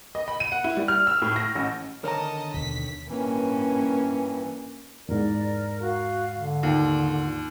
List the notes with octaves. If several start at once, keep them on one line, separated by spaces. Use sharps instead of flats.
D#5
B5
D#7
F#5
E4
G3
F6
E6
A2
A#6
A1
D3 D#3 A#4 C#5 D#5 A5 A#5
D#2 B2 B6
G2 E3 A#3 C#4
E2 G#2 A#4 D5
F#4 F5
D3
D#2 F4